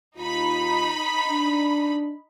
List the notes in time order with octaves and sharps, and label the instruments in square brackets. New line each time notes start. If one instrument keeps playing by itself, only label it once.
[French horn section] D#2 F4 [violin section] D#4 B5
[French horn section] D4